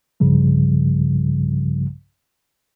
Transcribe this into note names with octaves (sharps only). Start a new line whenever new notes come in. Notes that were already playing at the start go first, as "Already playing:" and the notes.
B1 G2 C#3 F3 G3